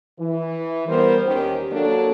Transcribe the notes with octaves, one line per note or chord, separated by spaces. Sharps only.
E3
G3 B3 A#4 C5
D#2 D#3 C#4 G4
F#3 A#3 D4 F#4 A4